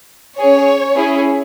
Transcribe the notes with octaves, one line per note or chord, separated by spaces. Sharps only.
C#4 G#4 C#5
C#4 E4 G#4